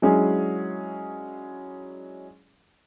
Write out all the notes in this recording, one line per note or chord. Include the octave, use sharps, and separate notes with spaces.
F#3 G#3 C#4 D4 E4 G#4